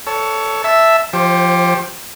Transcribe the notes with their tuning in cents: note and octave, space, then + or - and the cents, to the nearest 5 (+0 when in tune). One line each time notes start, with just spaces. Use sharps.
A4 +5 C#5 +20
E5 +0 A5 +0
F3 +0 G4 +0 C5 +35